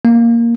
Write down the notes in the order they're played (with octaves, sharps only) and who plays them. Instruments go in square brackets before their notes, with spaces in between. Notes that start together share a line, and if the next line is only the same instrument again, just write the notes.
[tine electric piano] A#3